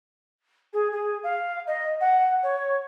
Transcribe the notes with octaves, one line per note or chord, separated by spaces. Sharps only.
G#4
G#4
F5
D#5
F#5
C#5